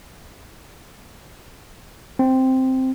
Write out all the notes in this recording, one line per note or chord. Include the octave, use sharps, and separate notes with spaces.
C4